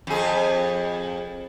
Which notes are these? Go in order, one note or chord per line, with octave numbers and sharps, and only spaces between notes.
F2 G#4